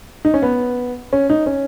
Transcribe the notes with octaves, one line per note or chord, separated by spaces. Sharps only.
D#4
C#4
B3
C#4
D#4
C#4